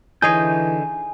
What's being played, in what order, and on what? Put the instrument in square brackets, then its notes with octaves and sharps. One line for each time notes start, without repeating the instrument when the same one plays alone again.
[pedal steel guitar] D3 D#5 G6 [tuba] E3 [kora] D#4 G#4 C#5 [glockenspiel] G#5